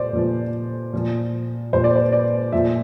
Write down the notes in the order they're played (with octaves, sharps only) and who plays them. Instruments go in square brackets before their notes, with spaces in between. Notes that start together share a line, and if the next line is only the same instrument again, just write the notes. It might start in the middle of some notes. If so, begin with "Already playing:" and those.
Already playing: [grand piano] A#2 C5 D5
A#2 F3
A#2 F3
A#2 F3 C5
D5
C5
D5
A#2 F3 E5